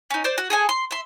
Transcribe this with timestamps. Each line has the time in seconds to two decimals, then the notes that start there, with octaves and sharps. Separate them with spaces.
0.11 C#4 D#4
0.24 C5 D5
0.38 F#4
0.50 G#4 A4 G#5
0.69 C6
0.91 E5 C6